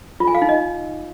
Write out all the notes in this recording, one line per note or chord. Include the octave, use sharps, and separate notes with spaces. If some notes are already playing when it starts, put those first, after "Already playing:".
F4
G#5
F5
D#4
D#5